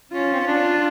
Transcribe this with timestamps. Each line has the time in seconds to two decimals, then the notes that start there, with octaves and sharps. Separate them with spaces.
0.11 C#4 F4
0.33 C4
0.39 C#4
0.47 D4